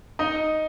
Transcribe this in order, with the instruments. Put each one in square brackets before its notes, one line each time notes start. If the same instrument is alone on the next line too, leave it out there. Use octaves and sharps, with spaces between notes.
[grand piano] D#4 D#5